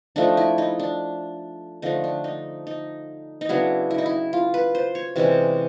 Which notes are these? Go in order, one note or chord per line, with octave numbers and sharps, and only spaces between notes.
F3 A3 D4 D#4
E4
D#4
D4
D3 F3 A3 D4 D#4
D4
D#4
D#4
D#4
C#3 F#3 B3 D4 E4
E4
D#4
E4
F4
B4
C5
C#5
C3 E3 G#3 C#4 D5